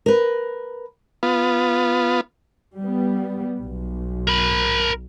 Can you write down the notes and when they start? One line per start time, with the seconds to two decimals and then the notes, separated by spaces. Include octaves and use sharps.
0.06 A#4 B4
1.23 B3 F4
2.77 G3 B3
3.59 B1
4.27 A#4 B5